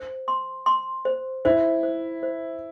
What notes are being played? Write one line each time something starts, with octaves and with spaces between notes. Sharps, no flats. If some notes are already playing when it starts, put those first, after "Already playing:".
Already playing: C5
C6
C6
C5
E4 C5
C5
C5